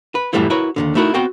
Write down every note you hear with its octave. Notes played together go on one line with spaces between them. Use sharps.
B4
F#2 A2 E3 G3 A3 E4
E4 F#4 A#4 B4 C#5
D#2 A#2 D3
A3 D#4 E4 F#4 A#4
B3 C4 F#4 B4 C5 G5